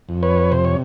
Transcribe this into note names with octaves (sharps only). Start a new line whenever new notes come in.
F2
B4 C#5
C3 C5
C#5